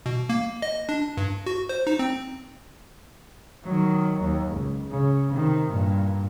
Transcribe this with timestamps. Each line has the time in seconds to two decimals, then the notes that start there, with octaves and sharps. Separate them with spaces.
0.06 B2
0.29 A#3
0.62 D#5
0.89 D4
1.17 G2
1.46 F#4
1.69 C5
1.87 D#4
1.99 C4
3.63 D#3 F#3
4.20 D#2
4.51 C#2
4.90 C#3
5.30 C3 D#3
5.68 G2 A#2